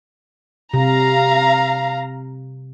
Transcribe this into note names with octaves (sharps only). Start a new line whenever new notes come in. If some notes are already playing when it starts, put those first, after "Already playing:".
C3 F5 A#5